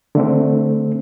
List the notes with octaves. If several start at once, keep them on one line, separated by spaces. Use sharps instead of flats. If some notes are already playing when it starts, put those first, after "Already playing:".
D3 A3 C4